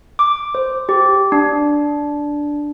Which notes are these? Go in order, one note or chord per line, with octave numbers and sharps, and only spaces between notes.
D6
C5
G4
D4